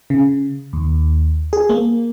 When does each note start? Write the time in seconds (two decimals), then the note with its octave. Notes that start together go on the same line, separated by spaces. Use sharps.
0.10 C#3
0.73 D#2
1.53 G#4
1.69 A#3